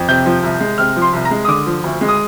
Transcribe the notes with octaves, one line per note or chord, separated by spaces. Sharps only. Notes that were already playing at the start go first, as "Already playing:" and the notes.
Already playing: F2
C3 G6
F3
C2
G#3
C3 F6
F3
C6
C2
A#5
G#3
D#6
D3 D6
F3
D2
G#3
D#6